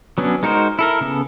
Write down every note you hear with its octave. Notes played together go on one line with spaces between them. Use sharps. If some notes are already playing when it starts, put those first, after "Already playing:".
F#3 B3 C#4 D4
G#3 D#4 F#4 A#4 C5
E4 A4 A#4
C#3 B3 A4